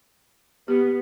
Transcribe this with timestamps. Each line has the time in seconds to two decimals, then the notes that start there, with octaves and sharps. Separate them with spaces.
0.68 B3 G4